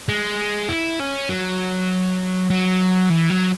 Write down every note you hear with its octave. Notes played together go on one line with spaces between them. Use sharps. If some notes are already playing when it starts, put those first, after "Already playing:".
G#3
E4
C#4
F#3
F#3
E3
F#3